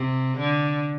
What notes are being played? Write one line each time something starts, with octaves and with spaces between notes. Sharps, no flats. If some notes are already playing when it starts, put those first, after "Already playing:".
Already playing: C3
D3